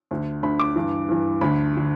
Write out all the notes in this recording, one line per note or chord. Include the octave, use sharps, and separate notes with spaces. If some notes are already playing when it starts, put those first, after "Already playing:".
D2 D3
D2 D3 B5
D6
G2 E3
G2 E3
D2 D3 B5
D3